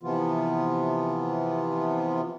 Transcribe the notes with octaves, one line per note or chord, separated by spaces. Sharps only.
C3 E3 F3 B3 F4